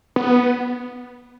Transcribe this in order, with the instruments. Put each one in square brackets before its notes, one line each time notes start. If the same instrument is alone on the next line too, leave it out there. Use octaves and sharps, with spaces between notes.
[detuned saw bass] B3